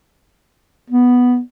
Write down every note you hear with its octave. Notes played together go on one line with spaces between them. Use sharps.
B3